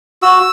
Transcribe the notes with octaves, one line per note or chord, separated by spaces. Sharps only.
F#4 E6